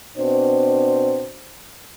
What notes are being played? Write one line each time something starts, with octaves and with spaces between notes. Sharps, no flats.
B2 C4 D4 C5